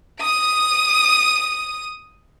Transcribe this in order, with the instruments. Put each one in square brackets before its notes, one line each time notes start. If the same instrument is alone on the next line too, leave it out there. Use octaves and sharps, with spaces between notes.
[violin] D#6 D#7